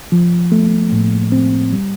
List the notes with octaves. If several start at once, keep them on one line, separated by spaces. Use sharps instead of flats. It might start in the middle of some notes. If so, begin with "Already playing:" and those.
F3
A3
A2
C4
G3